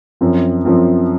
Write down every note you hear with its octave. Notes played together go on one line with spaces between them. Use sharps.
F#2 F3 C4
F#2 F3 C4